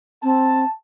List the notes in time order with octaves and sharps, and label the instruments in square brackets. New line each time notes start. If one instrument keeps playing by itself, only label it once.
[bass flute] C4 [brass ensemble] A5